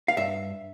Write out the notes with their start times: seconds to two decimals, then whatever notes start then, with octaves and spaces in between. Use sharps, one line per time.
0.08 F5
0.17 G2 E5